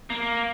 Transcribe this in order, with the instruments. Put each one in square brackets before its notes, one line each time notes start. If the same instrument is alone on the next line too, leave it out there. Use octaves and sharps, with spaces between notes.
[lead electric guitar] A#3